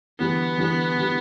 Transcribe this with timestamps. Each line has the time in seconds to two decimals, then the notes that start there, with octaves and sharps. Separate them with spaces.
0.19 E2 D3 G3 B3
0.58 E2 D3 G3
0.98 D3 G3